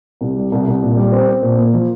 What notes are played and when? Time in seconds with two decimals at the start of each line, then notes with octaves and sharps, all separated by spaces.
0.21 C2
0.36 G3
0.52 C2
0.67 C2
0.83 A#2
0.97 G3
1.12 C4
1.28 C4
1.42 A#2
1.57 A#3
1.74 F3